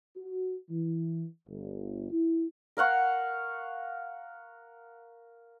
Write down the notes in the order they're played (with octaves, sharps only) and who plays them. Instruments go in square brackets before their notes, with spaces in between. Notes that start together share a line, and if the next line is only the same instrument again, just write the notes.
[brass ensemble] F#4
E3
G1
E4
[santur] A#4 F5 F#5 C#6